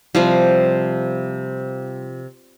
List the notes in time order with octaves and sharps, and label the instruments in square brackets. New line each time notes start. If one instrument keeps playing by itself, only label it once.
[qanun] C3 F3 G3